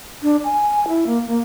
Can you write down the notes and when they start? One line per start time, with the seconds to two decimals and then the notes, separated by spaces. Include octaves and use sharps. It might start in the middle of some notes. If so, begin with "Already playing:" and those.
0.23 D4
0.44 G#5
0.88 E4
1.07 A#3
1.26 A#3